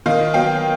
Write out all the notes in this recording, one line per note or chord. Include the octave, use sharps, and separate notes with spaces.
D#3 D#5 F5
F#3 B3 F5 G5